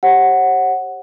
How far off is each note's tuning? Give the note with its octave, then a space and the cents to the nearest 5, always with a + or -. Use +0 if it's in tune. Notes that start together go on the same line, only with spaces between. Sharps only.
G4 +0 C#5 -45 F#5 +0